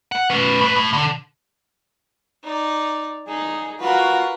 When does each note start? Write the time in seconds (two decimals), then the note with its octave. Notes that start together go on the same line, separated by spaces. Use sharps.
0.12 F#5
0.30 C#4 B4
0.61 A2 B4
0.76 A2
0.93 D3
2.43 D#4 D5
3.28 D#4 G#4
3.80 F4 F#4 A#4 B4